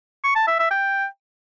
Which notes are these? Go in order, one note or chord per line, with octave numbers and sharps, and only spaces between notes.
C#6
A5
E5
E5
G5